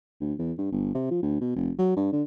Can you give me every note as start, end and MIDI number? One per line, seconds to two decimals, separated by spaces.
0.21 0.34 38
0.39 0.52 40
0.58 0.69 43
0.72 0.93 31
0.95 1.06 48
1.11 1.19 53
1.23 1.37 38
1.41 1.53 47
1.56 1.71 29
1.78 1.92 54
1.97 2.10 43
2.13 2.23 50